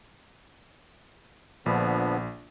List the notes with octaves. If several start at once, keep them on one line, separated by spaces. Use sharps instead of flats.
A#1 D3 F3 B3 B5